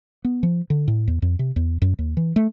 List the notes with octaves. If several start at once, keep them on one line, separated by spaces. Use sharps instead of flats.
B3
F3
D3
A2
E2
F2
C3
E2
F#2
D#2
E3
A3